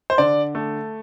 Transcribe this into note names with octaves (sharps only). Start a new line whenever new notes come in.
C5
D3 D5
A3